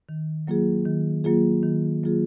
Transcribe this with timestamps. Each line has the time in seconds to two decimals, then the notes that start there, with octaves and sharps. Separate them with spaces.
0.09 D#3
0.47 F#3 A#3 F4 G#4
0.86 D#3
1.24 F#3 A#3 F4 G#4
1.63 D#3
2.03 F#3 A#3 F4 G#4